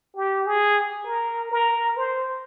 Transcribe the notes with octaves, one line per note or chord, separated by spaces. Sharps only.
G4
G#4
A#4
A#4
C5